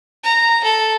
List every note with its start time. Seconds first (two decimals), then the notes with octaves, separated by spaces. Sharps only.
0.23 A#5
0.64 A4